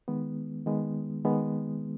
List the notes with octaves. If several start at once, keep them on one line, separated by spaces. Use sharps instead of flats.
D#3 G#3 B3
D#3 G#3 B3
D#3 G#3 B3